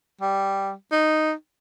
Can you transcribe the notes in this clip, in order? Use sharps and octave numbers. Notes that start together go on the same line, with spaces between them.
G3
D#4